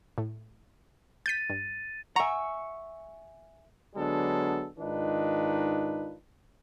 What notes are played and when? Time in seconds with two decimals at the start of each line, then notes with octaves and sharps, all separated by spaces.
0.18 A2
1.26 G6 A6 B6 D#7
1.49 G2
2.16 E5 F#5 G#5 A#5 C#6
3.95 D3 F#3 G#3 B3 D4 A4
4.79 G#2 D#3 D4 D#4 F4 B4